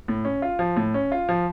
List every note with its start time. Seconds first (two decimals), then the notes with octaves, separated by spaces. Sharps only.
0.08 A2
0.25 C#4
0.42 F4
0.59 F3
0.76 A2
0.94 C#4
1.12 F4
1.29 F3